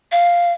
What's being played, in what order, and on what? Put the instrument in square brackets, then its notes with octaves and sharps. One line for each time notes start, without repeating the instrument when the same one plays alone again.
[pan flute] F5